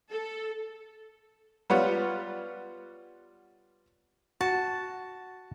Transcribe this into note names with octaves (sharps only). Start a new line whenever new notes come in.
A4
G3 B3 F4 C#5 F#5
F#4 A5